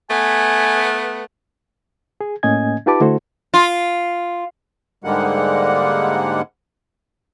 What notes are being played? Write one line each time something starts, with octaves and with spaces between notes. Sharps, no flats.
A3 B3 G#5
G#4
A2 A#3 C#4 D#5 G#5 G#6
D#4 F4 G4 B4 A5 D6
D3 A3 E4 F#4 A4 C5
F4
G#2 D3 G3 G#3 A#3 F#5